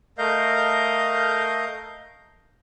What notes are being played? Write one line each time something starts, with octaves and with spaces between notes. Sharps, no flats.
A3 A#4 D#5 F5 G6